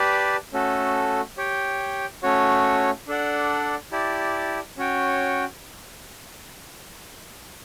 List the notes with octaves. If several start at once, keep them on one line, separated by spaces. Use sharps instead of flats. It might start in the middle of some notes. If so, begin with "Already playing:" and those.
Already playing: G4 B4 D5 A5
A3 C#4 F#4 A4
G4 C#5 G5
A3 C#4 F#4 C#5
D4 A4 D5 F#5
E4 G4 D5 A5
C#4 F#4 C#5 G5